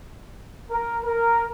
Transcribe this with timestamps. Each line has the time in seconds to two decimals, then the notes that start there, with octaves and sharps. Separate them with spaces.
0.68 A#4
1.02 A#4